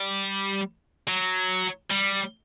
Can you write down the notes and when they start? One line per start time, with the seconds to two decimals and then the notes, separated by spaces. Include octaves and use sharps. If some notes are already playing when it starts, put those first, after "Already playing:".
Already playing: G3
1.08 F#3
1.91 G3